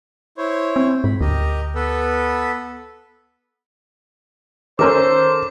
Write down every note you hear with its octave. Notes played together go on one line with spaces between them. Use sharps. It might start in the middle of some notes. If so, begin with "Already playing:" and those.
E4 C5 C#5
C4
G#2 B5
D2 G4 A#4 D#5
B3 A4 B4
D#3 C#4 A4 A#4 C5 D6 E6